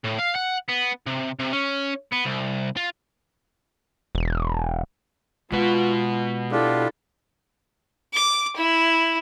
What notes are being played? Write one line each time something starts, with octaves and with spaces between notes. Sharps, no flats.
A2
F5
F#5
B3
C3
C3
C#4
B3
C2
F4
E1
B2 G#3 F4 B4 F#5
D4 E4 F4 G4 A4
D6
E4